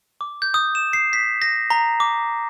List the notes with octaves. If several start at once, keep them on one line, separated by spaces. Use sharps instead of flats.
D6
G6
D#6
E7
C7
B6
A#6
A#5
D6